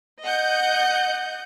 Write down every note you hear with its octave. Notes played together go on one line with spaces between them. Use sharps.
D#5 F#5 G6